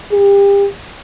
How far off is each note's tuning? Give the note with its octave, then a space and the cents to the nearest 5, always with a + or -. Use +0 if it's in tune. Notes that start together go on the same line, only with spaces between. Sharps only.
G4 +30